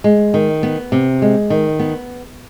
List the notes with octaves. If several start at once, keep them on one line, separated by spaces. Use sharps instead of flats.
G#3
D#3
B3
C3
G#3
D#3
B3